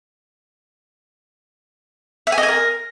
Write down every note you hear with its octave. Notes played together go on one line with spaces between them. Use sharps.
E5
G#5
D#5
G#5
A#4